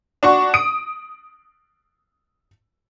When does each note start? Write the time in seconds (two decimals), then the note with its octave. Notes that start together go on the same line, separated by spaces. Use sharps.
0.23 D4 F#4 C#6
0.54 D#6 D7